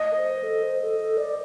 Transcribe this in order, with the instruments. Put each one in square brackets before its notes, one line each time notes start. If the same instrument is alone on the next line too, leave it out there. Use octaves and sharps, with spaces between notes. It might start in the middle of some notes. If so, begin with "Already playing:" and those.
Already playing: [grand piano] D#5
[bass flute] A#4
C5
A4
C5
A4
A4
D5